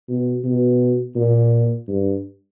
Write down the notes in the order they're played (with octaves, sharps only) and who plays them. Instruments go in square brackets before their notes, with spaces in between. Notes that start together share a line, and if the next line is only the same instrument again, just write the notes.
[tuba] B2
B2
A#2
G2